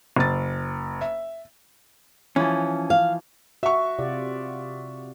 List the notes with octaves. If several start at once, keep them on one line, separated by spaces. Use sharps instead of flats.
F#1 A6
E5
E3 F3 C#4
F5
F#4 E5 C#6
C3 F4 D5